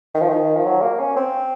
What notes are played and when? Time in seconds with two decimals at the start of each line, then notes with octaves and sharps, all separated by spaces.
0.14 D#3
0.21 F3
0.29 D#3
0.56 F3
0.65 F#3
0.82 A#3
0.99 C#4
1.16 C4